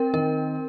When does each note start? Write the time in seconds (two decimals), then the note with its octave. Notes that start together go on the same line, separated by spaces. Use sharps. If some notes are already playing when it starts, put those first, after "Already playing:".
Already playing: C4 A#4
0.13 D#3 A#4